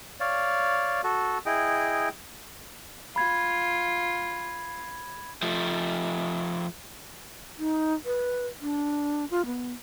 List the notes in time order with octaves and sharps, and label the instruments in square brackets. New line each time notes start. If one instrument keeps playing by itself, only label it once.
[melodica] C#5 D5 F5
F#4 A4
E4 G#4 D#5 G5
[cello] F4 [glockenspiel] B5 G#6
[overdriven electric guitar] F3 A3
[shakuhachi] D#4
B4
D4
F4
B3